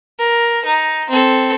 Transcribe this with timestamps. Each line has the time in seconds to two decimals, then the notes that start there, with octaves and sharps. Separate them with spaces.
0.19 A#4
0.65 D#4
1.10 C4 A4